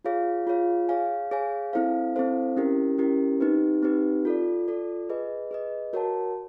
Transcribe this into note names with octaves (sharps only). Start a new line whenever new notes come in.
F4 G#4 C#5 F5
F4 G#4 C#5 F5
G#4 C#5 F5 G#5
G#4 C#5 F5 G#5
C4 E4 A4 C5 F5
C4 E4 A4 C5 F5
C#4 E4 G4 A#4
C#4 E4 G4 A#4
C4 D#4 G4 B4
C4 D#4 G4 B4
F4 A4 D5
F4 A4 D5
G#4 B4 D#5
G#4 B4 D#5
F#4 A#4 C#5 F#5 A5